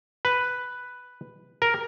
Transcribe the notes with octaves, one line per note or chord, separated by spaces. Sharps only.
B4
A#4